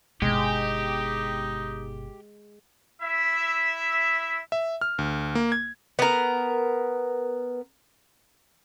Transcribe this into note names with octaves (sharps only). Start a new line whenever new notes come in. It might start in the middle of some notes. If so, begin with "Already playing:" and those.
G1 B2 G#3 D#4 G4
E4 E5
E5
F6
D2
A#3
G#6
B3 A#4